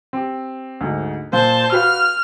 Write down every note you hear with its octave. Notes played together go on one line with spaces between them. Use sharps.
C4 G4
D2 G#2 D#4
A#2 C5 A5
F#4 B4 F5 F6